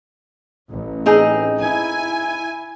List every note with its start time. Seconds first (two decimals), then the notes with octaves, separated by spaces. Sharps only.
0.69 A1
1.06 C4 D#4 G#4
1.59 E4 G#5